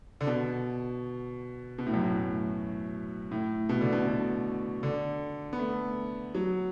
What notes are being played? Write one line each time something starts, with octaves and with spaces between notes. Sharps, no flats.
D3
B2
B2
A2
F#2
A2
A2
B2
D3
B2
B2
D3
B3
A3
F#3